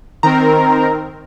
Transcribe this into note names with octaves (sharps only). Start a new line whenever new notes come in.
D#3 C4 A#4 A#5